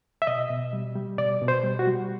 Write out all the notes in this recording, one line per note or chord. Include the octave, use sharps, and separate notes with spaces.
E5
B2 D#5
B2
G3
G3
B2 D5
B2
C5
G3
F#4
G3